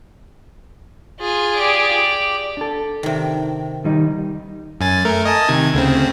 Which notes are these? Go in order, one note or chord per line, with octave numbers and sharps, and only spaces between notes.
F4 G#4
G4 D5
D4 A4
C3 D#3
D#3 G3 D#4
F#2 G#5 A6
A3 A#4
D#5 G#5 A5
C3 D#3 G#6
D2 C#3 C4